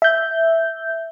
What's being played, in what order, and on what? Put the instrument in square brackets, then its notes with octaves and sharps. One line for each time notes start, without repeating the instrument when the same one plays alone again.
[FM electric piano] E5 G6